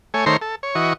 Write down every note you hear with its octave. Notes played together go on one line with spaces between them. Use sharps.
A3 C#5 G#5
D#3 A3 C5 C#5 A#5 C6
A4
C#5
E3 F#4 D#5 C#6